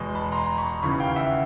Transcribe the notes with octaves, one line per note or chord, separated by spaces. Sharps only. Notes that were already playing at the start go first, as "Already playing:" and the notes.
Already playing: E2 B2 G#3
A5 B5
A#5 C6
B5 C#6
D#2 C#3 E3 B5 C#6
F5 G5
G5
E5 F#5